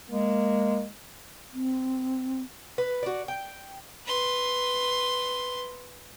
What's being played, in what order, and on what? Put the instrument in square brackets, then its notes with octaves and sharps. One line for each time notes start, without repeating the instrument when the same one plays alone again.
[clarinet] G#3 [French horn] A#3
[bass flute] C4
[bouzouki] B4
F#4 D5
G5
[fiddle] B4 C6